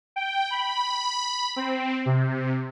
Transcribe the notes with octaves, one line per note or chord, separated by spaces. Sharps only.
G5
B5
C4
C3